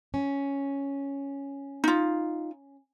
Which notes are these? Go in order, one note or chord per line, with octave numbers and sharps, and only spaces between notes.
C#4
D#4 F4